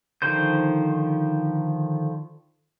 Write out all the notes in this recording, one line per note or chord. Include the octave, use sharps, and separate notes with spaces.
D3 D#3 F3 C5 G6